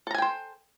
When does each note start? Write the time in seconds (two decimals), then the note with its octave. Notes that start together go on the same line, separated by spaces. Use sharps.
0.07 A4
0.11 A#5
0.14 G#5
0.18 G5
0.22 C5